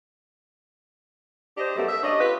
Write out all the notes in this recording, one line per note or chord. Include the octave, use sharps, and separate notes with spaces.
D4 G4 C5 D#5
F#2 G3 A3 B3
E5
C#4 D4 D#5
F4 G4 B4